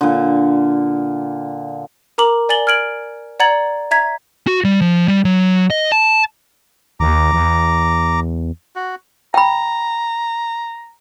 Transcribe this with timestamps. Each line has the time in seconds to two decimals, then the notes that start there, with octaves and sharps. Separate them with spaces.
0.01 A#2 D3
2.18 A#4 A#5 D6 F#7
2.49 D5 G#5 A6 F#7 G7
2.67 F6 G#6 D7 F#7
3.40 D5 F#5 A#5 G#6 A6 F#7
3.91 E5 A#5 G#6 B6
4.47 F#4
4.64 G3
4.82 F3
5.08 G3
5.25 F#3
5.70 D#5
5.92 A5
7.00 D#2 A#5 D6
7.32 E2
8.76 F#4
9.34 G5 A#5 B5